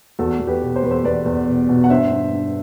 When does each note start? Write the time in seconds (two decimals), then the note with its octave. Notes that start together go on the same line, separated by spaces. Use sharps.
0.19 E2 F#4 A4
0.40 E2
0.47 G4 B4
0.62 B2
0.76 C5
0.83 E2 B4
0.91 A4 C5
1.04 E2 B4 D5
1.25 E2
1.47 B2
1.69 B2
1.84 F#5
1.90 G2 C5 E5
2.11 G2
2.33 G2